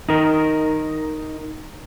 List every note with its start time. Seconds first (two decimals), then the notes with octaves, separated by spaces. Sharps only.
0.09 D#4 A#4